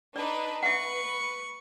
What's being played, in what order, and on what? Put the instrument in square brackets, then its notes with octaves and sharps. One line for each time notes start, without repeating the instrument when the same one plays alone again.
[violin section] D4 D#4 B4 [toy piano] D5
[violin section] B4 [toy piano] E5 F#5 [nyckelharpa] C#6